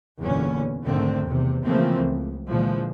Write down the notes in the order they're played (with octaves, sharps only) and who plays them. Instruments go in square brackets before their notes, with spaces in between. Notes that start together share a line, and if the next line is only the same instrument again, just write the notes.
[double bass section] F#1 E2 A#2 D3 B3 C#4
B1 G#2 D3 D#3 A3 C4
E2 C3
C#3 E3 F3 A3 A#3 C4
C#2
A#2 D3 E3 F3 G#3